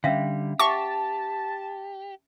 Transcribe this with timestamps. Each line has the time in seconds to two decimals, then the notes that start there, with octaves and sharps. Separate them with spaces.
0.04 D3 G3 C#4 E5 F5
0.59 G4 E5 F#5 A5 C#6 D6